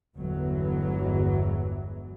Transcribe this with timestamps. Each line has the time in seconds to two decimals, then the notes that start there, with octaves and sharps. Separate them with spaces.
0.16 G1 E2 E3 F#3 G#3